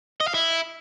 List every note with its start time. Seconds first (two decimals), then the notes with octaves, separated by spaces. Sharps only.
0.21 D#5
0.27 F5
0.34 E4